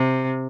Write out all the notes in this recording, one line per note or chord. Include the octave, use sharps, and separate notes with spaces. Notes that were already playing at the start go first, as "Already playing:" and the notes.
Already playing: C3